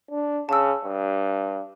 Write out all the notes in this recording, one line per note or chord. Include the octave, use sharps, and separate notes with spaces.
D4
C#3 A5 E6
G2